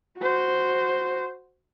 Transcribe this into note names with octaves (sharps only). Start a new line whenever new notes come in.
F#4 C5